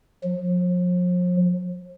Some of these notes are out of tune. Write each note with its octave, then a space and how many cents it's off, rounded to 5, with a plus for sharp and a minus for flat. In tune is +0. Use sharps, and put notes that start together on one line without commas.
F3 +40